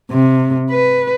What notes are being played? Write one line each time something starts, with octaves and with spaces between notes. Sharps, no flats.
C3
B4